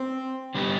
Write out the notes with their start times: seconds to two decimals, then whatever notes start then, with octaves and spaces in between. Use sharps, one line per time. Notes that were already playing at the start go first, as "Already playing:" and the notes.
Already playing: C4
0.55 D3 G3 B3 D#4 G4